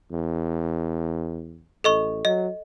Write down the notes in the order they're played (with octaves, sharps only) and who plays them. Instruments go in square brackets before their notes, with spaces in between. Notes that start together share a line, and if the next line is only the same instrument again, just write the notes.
[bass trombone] E2
[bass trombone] A1 [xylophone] A4 D#5 C#6
[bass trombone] F#3 [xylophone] D#5